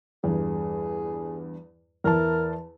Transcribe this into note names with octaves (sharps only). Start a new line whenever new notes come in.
E2 G2 G#4
E2 E4 A#4 A5